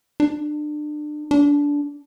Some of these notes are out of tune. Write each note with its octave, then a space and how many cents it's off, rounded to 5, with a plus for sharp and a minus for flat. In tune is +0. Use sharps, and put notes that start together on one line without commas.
D4 +30
D4 -20